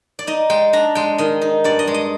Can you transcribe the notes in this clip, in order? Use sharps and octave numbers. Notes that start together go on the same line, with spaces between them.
D5
D#4 D#5
G#3 G5
D4 A#5
G#3 G5
D#3 D#5
D#4
G2 D5
D#5
G#3
D#5